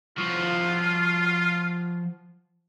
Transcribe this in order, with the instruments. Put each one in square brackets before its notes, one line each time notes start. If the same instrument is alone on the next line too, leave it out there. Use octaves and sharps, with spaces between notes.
[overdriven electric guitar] F3 F#4 [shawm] F4